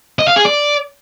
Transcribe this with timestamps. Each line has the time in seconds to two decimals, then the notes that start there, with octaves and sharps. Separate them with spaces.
0.19 D#5
0.28 F5
0.36 G#4
0.45 D5